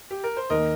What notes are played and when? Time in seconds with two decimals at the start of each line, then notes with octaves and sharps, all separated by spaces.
0.11 G4
0.24 A#4
0.37 C5
0.50 D#2 D#3 A#3 A#4 D#5